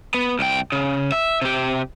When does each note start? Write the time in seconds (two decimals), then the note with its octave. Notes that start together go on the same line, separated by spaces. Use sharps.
0.14 B3
0.39 C2 G5
0.72 C#3
1.12 E5
1.42 C3 G4